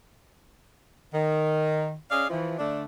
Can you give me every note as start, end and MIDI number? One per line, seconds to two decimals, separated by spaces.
1.14 1.94 51
2.10 2.25 61
2.10 2.25 68
2.10 2.25 74
2.10 2.25 75
2.10 2.25 77
2.30 2.55 52
2.30 2.55 53
2.58 2.83 50
2.58 2.83 57
2.58 2.83 62